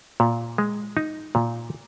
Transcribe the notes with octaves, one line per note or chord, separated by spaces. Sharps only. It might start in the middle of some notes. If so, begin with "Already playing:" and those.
A#2
G#3
D#4
A#2